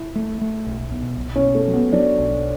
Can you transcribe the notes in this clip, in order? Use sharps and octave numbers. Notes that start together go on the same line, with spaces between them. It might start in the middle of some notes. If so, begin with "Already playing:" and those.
Already playing: E4
A3
A3
B1
B2
B1
C#4
B2
A3
F#3
B3
F#3 D4
B1